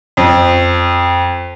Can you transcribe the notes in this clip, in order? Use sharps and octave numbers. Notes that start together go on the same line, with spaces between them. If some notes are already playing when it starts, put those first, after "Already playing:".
F2